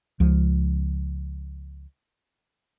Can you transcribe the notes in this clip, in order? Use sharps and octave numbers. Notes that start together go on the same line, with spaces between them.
C#2 F3